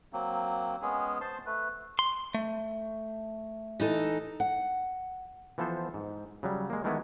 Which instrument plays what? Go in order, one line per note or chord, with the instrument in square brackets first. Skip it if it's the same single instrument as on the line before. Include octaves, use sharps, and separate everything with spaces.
[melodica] F#3 A#3 C4
G#3 B3 C#4 G#4
C5 A5 C6
A3 B4
[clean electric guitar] C6
A3
[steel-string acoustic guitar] E3 D#4 A4
[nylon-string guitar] F#5
[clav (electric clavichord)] E3 F3 B3 A4 C5
G#2
C#3 F#3 G3
G#3 A#3
D#3 E3 G#3 A3 B3 E4